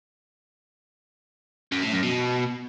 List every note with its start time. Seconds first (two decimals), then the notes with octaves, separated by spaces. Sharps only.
1.72 F#2
1.82 A2
1.93 F#2
2.03 B2